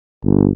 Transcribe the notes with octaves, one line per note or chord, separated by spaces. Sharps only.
G1